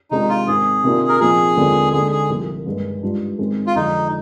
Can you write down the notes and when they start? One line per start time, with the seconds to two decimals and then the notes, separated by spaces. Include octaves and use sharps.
0.11 C3 D#3 G#3 D4 D#4 F4
0.29 F4
0.47 G#2 D#3 G#3 C4 G#4
0.84 C3 D#3 A#3 D4 F4
1.08 A#4
1.20 A#2 F3 C4 D#4 G#4
1.57 D#2 D3 G#3 C4 F4
1.93 D3 G#3 D#4 G#4
2.11 G#4
2.30 C2 A#2 F3
2.66 G2 D#3 G#3
3.02 G#2 G3 D4 F4
3.38 G#2 D#3 G#3 C4
3.67 F4
3.76 F2 D3 F3 G#3 D#4